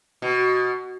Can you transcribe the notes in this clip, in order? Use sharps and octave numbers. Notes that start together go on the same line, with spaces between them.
B2